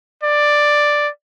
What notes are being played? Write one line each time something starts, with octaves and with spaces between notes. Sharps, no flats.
D5